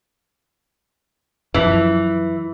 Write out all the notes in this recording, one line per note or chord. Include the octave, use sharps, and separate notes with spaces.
F#2 E3 F3